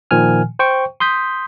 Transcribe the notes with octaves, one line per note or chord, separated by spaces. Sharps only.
A#2 D#3 F3 G#5 F6
C5 G5 C#6
C6 D#6 G6 B6